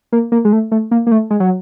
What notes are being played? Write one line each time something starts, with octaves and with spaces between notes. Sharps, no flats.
A#3
A#3
G#3
A3
A3
A#3
A#3
A3
G#3
F#3